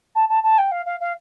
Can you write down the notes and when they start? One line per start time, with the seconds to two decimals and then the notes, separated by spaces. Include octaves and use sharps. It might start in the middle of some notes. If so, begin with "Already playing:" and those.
0.15 A5
0.29 A5
0.43 A5
0.58 G5
0.71 F5
0.86 F5
1.00 F5